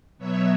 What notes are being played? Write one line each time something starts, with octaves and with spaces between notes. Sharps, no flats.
B2 F#3 B3 C#5 E5